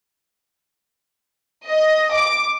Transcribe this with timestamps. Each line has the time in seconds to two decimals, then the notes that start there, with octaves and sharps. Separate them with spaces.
1.68 D#5
2.16 D6